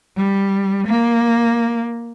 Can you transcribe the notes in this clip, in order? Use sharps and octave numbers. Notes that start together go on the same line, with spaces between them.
G3
A#3